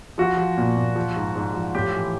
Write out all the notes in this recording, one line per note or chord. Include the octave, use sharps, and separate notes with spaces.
F3 F#4
F3
A#2
A#2
F3
G#2
G#2
F3
A2 G4
E3